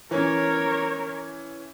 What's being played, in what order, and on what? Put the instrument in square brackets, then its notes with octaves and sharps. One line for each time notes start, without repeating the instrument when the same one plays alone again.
[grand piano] E3 C#4 [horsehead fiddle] A#4 C#5